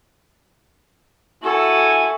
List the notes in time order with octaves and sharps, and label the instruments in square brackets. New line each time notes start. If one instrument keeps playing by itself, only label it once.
[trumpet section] E4 G#5 [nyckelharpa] F#4 A4